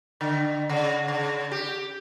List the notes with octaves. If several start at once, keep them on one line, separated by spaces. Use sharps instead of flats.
D3
C#3
C#3
G4